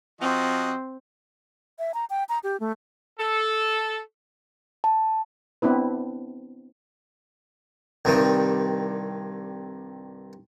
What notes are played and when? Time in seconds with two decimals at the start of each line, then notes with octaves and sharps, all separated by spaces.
0.21 F3 C4 F#4 D#5
1.79 E5
1.94 A#5
2.10 G5
2.29 A#5
2.43 G4
2.60 A3
3.18 A4
4.84 A5
5.62 B3 C4 D4 E4 B4
8.05 C2 G2 D#3